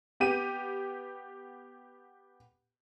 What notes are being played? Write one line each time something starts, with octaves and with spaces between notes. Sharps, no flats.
B3 G4 D#7